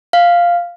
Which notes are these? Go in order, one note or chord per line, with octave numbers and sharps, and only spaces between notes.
F5